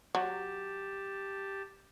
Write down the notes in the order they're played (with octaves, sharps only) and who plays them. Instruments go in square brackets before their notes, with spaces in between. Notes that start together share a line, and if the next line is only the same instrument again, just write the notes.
[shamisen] F#3 [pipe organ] G4 A5